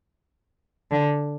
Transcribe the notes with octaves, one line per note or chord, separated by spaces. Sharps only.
D3